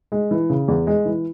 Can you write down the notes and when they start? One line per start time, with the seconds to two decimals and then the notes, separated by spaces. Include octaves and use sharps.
0.12 G#3
0.31 E3
0.50 C#3
0.68 E2
0.87 G#3
1.05 E3